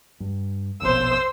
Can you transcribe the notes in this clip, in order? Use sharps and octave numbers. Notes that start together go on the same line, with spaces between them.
G2
F1 A#1 B2 C5 E6